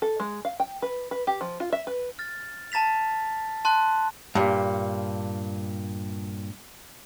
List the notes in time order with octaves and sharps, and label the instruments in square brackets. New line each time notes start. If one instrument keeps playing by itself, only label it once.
[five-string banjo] A4
G#3
F5
G5
B4
B4
G4
F3
F4
E5
B4
[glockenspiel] F6 A6
A5 A#5 A6 B6 F7
A5 C6 F#6
[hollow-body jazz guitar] G2 A#2